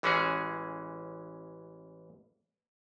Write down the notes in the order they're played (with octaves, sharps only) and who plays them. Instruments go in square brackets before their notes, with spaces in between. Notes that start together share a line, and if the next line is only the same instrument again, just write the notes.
[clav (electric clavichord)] A1 E3 G#3 C#4 F#4 G#4